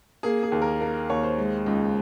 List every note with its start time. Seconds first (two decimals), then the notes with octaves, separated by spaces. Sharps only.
0.23 A#3 G#4
0.43 G#4
0.52 D#2
0.62 A#4
0.80 A#3 A#4
1.09 D#2 C#5
1.23 C5
1.38 G#3
1.66 C#2